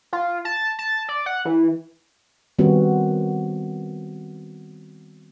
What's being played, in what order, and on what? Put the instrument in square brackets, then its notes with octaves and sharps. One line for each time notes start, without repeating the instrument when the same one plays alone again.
[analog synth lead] F4
A5
A5
D5
F#5
E3
[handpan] D#3 G3 B3 C4 F4 F#4